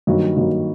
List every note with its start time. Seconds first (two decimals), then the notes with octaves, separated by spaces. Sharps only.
0.07 G2 D#3 F#3 A#3
0.37 G2 D#3 F#3 A#3